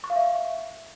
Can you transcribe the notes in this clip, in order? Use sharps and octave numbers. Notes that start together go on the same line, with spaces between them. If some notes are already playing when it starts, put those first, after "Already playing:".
C#6
F5
E5